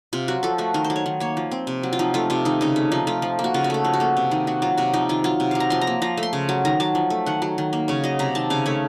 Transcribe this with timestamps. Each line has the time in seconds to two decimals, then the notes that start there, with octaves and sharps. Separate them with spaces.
0.13 C3 F4
0.28 F#3 F#4
0.43 F3 A4
0.58 A3 F#4
0.74 D#3 A#4
0.84 C5
0.90 F#3
0.96 C#5
1.06 D#3
1.20 A#3 C#5
1.37 F3
1.51 C4
1.67 C3
1.83 F#3
1.93 F4
1.99 F3 D#4
2.14 A3 F4
2.30 C3 F4
2.45 D#3 D#4
2.61 C#3 D#4
2.76 A3
2.92 F3 D#4
3.07 A3 F4
3.22 F3
3.39 A#3
3.44 F#4
3.54 C#3 F4
3.64 F#4
3.70 A3 A4
3.85 F3 A#4
3.93 F#4
4.00 A#3 A4
4.17 C3
4.31 D#3
4.47 D#3 F#4
4.62 F#3 F4
4.77 C3 F#4
4.93 F3 D#4
5.09 D#3 F4
5.24 F#3 F4
5.40 C3
5.51 F#3 F5
5.60 A#5
5.70 F3 C6
5.81 A#5
5.87 A#3
6.02 F3 A#5
6.17 A3
6.23 C6
6.33 C#3
6.49 F#3
6.65 D#3 A#5
6.80 F#3 A5
6.95 F3
7.10 A3
7.26 D#3 F#5
7.42 F#3
7.58 D#3
7.73 A#3
7.88 C#3 C#5
8.04 F#3 D#5
8.19 C3 A#5
8.35 D#3 A5
8.50 C#3 F5
8.66 A3 C#5